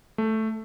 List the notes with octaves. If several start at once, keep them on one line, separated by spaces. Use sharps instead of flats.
A3